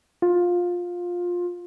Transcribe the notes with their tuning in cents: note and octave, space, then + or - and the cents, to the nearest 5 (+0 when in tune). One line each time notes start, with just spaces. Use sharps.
F4 +15